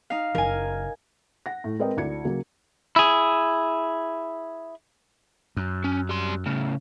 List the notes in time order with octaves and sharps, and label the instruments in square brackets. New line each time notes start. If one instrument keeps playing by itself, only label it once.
[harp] D#4 F5
[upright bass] F#1 [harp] A#4 G#5
[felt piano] F#5 A#6
A2
G#3 C4 A#4 B4 D#5 G5
D2 E4 D5 G#6 C#7
C#3 F#3 A#3
[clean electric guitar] E4 G#4
[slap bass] F#2
[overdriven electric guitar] C#4
G3 C6
A2 C#3